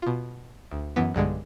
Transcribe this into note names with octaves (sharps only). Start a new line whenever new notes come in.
B2 F4
D2
F#2 E3 B3
B1 G2 D3 G#3